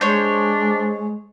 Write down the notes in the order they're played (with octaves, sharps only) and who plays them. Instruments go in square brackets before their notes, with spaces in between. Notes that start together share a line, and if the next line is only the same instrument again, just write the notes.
[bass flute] G#3 [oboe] D4 [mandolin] C5 C#5